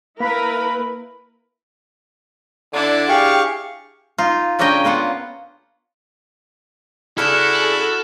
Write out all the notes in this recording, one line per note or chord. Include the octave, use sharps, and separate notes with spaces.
A#3 E4 A#4 B4 B5
D3 D4 E4
G4 G#4 F5 G5 C#6
D#4 F4
C#3 C#4 D4 A#4 D#5 G5
A#3 B3 F4 F#5
C#3 D4 E4 F#4 G#4 A4 F6 E7